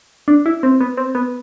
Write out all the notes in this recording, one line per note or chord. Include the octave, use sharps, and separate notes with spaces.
D4
E4
C4
B3
C4
B3